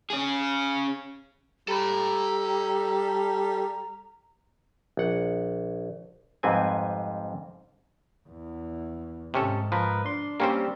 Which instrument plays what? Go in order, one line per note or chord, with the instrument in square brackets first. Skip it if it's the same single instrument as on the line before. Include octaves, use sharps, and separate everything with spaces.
[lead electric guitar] C#4 G#4
[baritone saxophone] G3 [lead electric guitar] A4 B5 [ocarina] A#5
[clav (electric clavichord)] A#1 F#5
F2 G#2 G3 C4 B4 G#5
[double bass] E2
[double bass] G#2 [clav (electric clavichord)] C3 C#4 A4
[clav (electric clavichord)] F3 [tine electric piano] A#4 B4
[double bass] D4 [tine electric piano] C6
[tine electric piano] G3 C4 [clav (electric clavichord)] A#3 C#4 C5